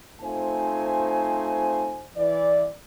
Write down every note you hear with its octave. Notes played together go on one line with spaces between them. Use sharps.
A3 C4 D#4 F4 C5 G#5
E3 D5